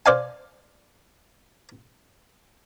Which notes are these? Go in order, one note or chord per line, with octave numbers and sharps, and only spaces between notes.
C5 D5 F5 G#5